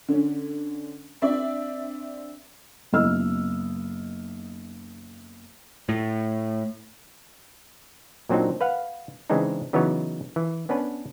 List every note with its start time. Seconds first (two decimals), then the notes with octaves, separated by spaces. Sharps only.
0.08 D3 C#4
1.22 C4 D4 D5 E5
2.93 F#1 B1 E4 D#5 E6 F6
5.89 A2
8.29 A#2 F#3 C4 D4 D#4
8.61 B4 F5 F#5
9.30 C#3 E3 G#3 C4 D4 D#4
9.73 C#3 E3 F#3 B3 D#4 C#5
10.36 E3
10.69 B3 C#4 D4 B4